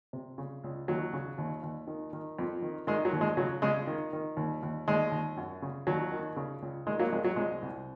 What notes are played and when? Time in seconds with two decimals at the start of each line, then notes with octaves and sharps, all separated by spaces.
0.13 C3
0.38 C#3
0.64 C#2
0.88 D#2 F#3
1.13 C#3
1.38 D#2
1.63 D#2
1.87 D#3
2.13 D#3
2.39 F2
2.62 D#3
2.87 D#3 G#3
3.05 F#3
3.13 D#2
3.21 G#3
3.37 C#3 F#3
3.62 C#3 G#3
3.87 D#3
4.13 D#3
4.37 D#2
4.63 D#2
4.88 D#2 G#3
5.12 D#2
5.37 F#2
5.62 C#3
5.87 D#2 F#3
6.12 D#3
6.36 C#3
6.62 C#2
6.87 D#3 G#3
7.00 F#3 A#3
7.12 F2 G#3
7.25 F#3
7.36 C2 G#3
7.62 C2